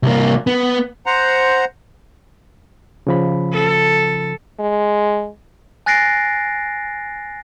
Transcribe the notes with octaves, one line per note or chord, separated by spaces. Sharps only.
C2 A#3
B3
C5 F#5 A#5
C#3 F3 B5
A4
G#3
G#5 F#6 A6 A#6 C7 D7